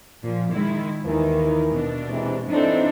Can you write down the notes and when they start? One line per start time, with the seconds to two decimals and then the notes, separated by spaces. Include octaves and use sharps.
0.22 A#2 F3
0.52 D#3 G#3 E4
1.05 D#2 D#3 E3 D#4 A#4
1.71 B2 D4
2.09 C3 E3 G#3
2.49 A2 E3 C4 D4 D#4 A4